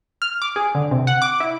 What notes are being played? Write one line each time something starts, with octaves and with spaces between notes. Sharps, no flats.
F6
D6
G#4
D3
C3
F#5
D6
E4